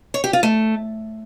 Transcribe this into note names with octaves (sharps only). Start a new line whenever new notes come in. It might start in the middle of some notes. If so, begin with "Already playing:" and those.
C#5
G4
F4
A3